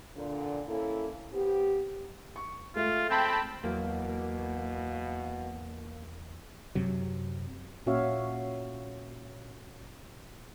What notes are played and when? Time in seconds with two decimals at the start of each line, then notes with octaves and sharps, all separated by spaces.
0.17 A#2 D3
0.68 A#3 C#4 E4 A4
1.33 B3 C4 G4
2.36 C#6
2.76 G#3 A3 F4 E5
3.10 C4 G5 A5 B5
3.64 E2 B2 F#3 A#3
6.75 F#2 C3 F#3
7.86 A#2 C#4 F#4 C#5 E5 F5